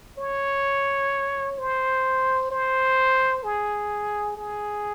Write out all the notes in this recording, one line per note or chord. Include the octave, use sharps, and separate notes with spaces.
C#5
C5
C5
G#4
G#4